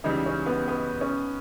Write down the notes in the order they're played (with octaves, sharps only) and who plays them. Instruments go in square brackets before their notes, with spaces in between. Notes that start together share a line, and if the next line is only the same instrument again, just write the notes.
[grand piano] C#2 C#3 E3 G3 [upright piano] D#4
[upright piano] C#4
B3
B3
C#4